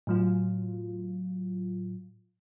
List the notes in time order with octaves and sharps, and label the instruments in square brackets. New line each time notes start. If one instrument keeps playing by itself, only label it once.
[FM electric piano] A2 F#3 F4